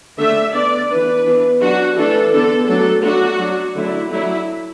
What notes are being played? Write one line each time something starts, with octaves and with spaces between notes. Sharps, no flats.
D3 A3 D4 E5
D3 B3 D4 D5
E3 B3 D4 B4
E3 B3 D4
F#3 D4 F#4
E3 A3 D4 A4
D3 B3 D4 A4
F#3 A3 D4 A4
F#3 A3 D4 F#4
F#3 D4
D3 F#3 A3 D4 E4
F#3 A3 D4 E4